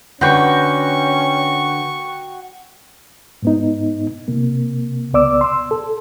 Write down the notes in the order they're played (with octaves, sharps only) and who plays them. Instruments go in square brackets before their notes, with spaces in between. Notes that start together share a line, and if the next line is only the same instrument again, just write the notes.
[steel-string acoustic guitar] D3 B4 [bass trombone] C#4 [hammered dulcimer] F#4 G5 [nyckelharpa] C#6
[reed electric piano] G#2 B3 D#4
C3 A#3
C#2 B3 D5 D6 E6
C6 E6
A4